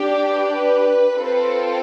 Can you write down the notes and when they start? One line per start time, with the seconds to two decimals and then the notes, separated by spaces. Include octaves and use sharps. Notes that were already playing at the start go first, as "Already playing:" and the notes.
Already playing: D4 G4
0.33 B4
1.16 C4 F4 A4